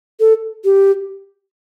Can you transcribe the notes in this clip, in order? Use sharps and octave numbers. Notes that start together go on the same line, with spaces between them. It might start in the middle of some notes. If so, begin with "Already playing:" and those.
A4
G4